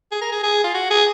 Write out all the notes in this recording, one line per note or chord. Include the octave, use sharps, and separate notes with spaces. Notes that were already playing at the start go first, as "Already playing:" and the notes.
G#4
A#4
G#4
G#4
F4
F#4
G#4